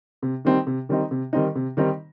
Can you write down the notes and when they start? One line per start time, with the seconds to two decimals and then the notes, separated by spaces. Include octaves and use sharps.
0.22 C3
0.45 D#3 G3 C4 D#4
0.67 C3
0.89 D#3 G3 C4 D#4
1.11 C3
1.33 D#3 G3 C4 D#4
1.55 C3
1.77 D#3 G3 C4 D#4